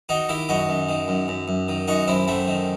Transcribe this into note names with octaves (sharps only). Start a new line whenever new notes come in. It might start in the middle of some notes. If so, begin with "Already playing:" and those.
D#3 D#4 F#4
D#3 E4 G4
F#2 D#4 F#4
F#2
D#3
F#2
F#2
F#2
D#3
F#2 D#4 F#4
F#2 C4 E4
F#2 A3 C4
D#3